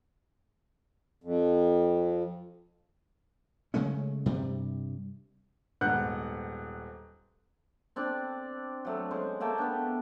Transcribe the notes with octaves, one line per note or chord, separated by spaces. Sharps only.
F2
C#3 G#3 A3 C#4
G2 C3 G3
D#1 G#2 B3 F#5 F#6 G6
C4 D4 D5
F#3 A3
G#3 C#4 C5
A3 A#3 G5 A5
B3 D4